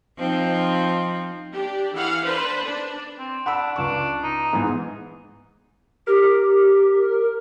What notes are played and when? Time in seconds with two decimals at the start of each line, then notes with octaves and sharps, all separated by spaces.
0.18 F3 C4 D#4
1.54 D4 G4
1.94 E3 F5 F#5
2.25 D4 B4 C5
2.63 D4
3.19 C4
3.46 D4 F#5 B5 E6
3.76 C#2 D4 C#6
4.23 D#4
4.53 G#2 E3 B3 G#4
6.07 G4 A#4